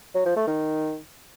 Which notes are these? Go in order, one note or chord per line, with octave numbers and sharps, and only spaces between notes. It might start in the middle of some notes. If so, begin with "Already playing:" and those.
F#3
F3
A3
D#3